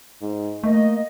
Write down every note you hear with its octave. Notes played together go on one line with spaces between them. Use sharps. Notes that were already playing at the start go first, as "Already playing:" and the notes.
G#2
A3 A#3 D#5